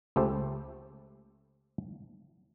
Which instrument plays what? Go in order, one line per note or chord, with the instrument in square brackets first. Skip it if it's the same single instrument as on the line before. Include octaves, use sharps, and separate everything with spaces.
[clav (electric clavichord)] C#2 A3 G4 A4 C5 G5